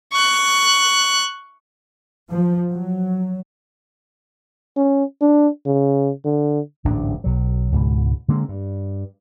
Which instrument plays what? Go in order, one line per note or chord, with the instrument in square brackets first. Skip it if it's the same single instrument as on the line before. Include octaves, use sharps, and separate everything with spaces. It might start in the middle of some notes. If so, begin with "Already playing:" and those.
[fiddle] C#6 F#6
[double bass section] F3
F#3
[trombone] C#4
D4
C#3
D3
[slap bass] D1 A1 G#2 D4
B1 F#3
C#2 G#2 B2
D3 G#3 A#3 C4
G2